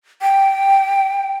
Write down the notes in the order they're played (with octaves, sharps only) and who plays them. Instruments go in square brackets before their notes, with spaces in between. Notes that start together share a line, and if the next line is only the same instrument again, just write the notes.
[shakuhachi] G5